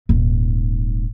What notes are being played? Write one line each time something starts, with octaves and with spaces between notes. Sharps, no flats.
D#1 G#2